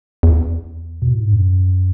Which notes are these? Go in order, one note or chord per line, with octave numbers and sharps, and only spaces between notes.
E2
B2
A2
G#2
F#2